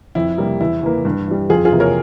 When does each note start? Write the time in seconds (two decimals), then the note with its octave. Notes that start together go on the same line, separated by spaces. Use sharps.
0.15 F2 E4
0.38 C3 G3 A#3
0.61 E2 E4
0.83 E3 A#3
1.05 G2
1.28 E3 G3
1.50 F2 F4 G#4
1.65 F4 G#4
1.72 C3 E3 A#3
1.80 A#4 C#5